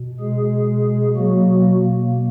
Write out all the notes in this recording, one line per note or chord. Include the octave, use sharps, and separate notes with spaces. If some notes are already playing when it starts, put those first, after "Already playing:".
Already playing: B2
G#3 G#4
B2 F#3 A#3 F#4